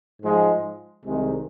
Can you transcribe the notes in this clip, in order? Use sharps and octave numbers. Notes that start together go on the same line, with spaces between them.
G#2 F3 G#3
C2 C3 D#3 G#3